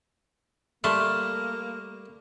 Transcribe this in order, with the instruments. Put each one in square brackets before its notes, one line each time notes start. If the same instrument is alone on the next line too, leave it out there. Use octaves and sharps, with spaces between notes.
[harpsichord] G3 A5 C6 [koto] A3 [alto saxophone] A#3 [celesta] F6